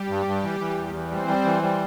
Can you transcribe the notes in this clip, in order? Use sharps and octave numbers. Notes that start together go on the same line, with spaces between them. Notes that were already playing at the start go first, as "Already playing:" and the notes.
Already playing: G3 G4
G2
G2
E3
E3
E2
E3
G3 C4 C5
G3
E3
G3